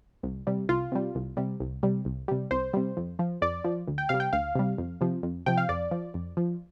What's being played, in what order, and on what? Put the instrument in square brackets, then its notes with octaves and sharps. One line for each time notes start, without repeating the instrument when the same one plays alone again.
[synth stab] C2
C3 G3
C2 F4
C3 G3
C2
C3 G3
C2
C3 G3
C2
C3 G3
C2 C5
C3 G3
F2
F3
F2 D5
F3
D2
G5
C3 G3 F5
G5
D2 F5
C3 G3
F2
C3 F3
F2
C3 F3 G5
F5
F2 D5
F3
F2
F3